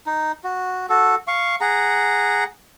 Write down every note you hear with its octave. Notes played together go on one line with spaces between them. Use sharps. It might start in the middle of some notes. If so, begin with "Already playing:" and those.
D#4
F#4
F#4 A4
F5 C#6
G#4 F#5 A#5